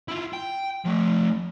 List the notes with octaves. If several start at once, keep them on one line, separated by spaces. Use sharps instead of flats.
E4 F4
G5
F3 A3